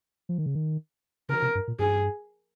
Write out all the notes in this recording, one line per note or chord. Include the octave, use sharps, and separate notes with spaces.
F3
D#3
C#3
D#3
C#3 A#4
C3
G2
A#2
G2 G#4